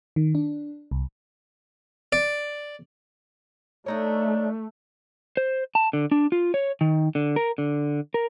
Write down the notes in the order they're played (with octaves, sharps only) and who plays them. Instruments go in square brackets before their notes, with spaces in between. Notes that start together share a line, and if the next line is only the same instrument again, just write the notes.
[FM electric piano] D#3
D4
C2
[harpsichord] D5
[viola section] A3 [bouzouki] D4 D#4 C#5
[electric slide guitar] C5
A5
D3
D4
F4
C#5
D#3
D3
A#4
D3
A#4